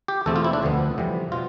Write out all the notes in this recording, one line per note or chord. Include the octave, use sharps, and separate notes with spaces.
G4
E2 B2 A3 C4 A4
F4
E4
D4
D2 D3 F3 B3
F2 C3 E3 G3 B3
B2 F4